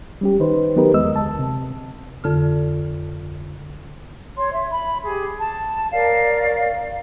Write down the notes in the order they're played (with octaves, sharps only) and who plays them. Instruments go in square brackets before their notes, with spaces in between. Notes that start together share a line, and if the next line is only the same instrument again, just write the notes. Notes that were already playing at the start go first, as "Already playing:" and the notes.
[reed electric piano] G3 C#4 G4
D#3 D#4 B4 C5
F#3 B3 D#4 G4 A#4 B4
E2 G#3 D#5 E6
D2 A5
C3
[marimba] F2 D3 A4 F6
[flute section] C#5 C6
E5
B5
G4 G#4
A5
A#4 C#5 D5 F5